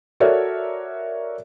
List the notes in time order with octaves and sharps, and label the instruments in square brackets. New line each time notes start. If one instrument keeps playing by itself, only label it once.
[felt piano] F#4 A4 A#4 C#5 D5 E5